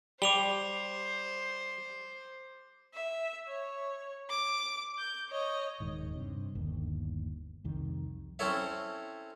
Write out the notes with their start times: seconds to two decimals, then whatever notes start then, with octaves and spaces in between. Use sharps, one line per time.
0.22 G3 C5 D6 F7 G7
2.94 E5
3.48 C#5
4.30 D6 D7
4.99 G6
5.30 C#5 D#5
5.80 D#1 G#2 D#3
6.16 G2 C3
6.55 G1 D#2
7.64 C2 F2 D#3 G3
8.39 C4 C#4 E4 A4 C#5 E5